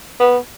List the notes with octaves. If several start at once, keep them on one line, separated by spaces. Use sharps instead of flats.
B3